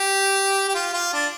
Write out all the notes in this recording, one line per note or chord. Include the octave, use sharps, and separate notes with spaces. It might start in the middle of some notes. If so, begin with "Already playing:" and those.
Already playing: G4
G4
F4
F4
D4